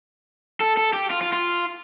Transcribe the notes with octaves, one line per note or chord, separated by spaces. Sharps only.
A4
A4
G4
F4
F4
F4